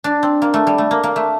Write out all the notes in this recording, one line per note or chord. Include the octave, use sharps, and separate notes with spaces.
D4
C4
A#3
A3
G3
A3
A#3
A#3
A3